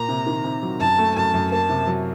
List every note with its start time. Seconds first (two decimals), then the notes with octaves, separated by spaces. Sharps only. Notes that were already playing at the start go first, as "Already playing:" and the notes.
Already playing: A#2 A#5
0.09 C3
0.27 D#3
0.44 C3
0.63 F#3
0.80 F#2 A5
0.98 A3
1.16 F#2 A5
1.34 F#2
1.52 A#3 A5
1.69 C3
1.87 F#3